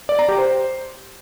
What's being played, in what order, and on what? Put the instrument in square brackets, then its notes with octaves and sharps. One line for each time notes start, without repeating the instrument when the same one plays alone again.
[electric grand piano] D5
A#5
G4
C5